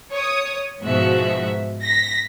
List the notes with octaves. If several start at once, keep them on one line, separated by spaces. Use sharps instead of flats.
C#5 D#6
G#2 B2 F3 F#4 E5
A#6 B6